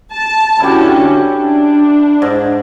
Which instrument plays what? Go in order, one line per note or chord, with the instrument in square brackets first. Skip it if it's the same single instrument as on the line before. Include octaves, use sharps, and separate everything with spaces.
[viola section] A5
[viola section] D3 C#4 F#4 [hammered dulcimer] E4 G4
[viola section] D4
[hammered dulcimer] G#2